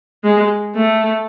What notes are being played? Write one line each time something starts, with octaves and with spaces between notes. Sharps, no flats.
G#3
A3